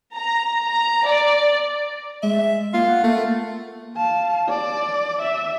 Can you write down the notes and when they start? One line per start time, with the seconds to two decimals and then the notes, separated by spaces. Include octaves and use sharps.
0.15 A#5
0.64 A#5
1.07 D5
2.23 G#3 E5
2.74 A#3 F4
2.88 F#5
3.04 A3 A#3
3.97 F5 A5
4.49 D5
5.22 E5